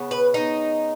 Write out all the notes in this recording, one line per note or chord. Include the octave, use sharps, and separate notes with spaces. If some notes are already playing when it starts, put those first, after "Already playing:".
Already playing: C#3 B3
B4
D#4